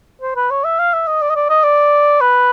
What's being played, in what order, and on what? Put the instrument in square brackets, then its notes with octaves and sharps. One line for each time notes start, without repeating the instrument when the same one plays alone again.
[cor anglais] C5
B4
C#5
E5
F5
E5
D#5
D5
D#5
D5
D#5
D5
B4